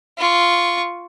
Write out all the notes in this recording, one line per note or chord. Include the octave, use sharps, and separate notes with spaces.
F4 C#6